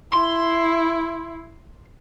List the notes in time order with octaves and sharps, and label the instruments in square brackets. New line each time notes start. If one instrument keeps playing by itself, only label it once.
[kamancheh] E4 [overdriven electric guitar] C6